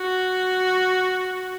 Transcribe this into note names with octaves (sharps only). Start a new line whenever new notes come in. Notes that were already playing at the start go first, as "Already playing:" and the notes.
Already playing: F#4